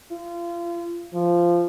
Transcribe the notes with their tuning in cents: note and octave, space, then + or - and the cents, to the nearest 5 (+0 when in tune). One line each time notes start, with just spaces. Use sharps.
F4 -30
F3 -10